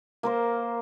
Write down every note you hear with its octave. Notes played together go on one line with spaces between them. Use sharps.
A#3 A#4 C5